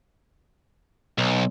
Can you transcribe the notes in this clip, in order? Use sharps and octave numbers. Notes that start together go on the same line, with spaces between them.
B1